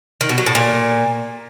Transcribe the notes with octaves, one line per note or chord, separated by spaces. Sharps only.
D#3
B2
F#3
A2
A#2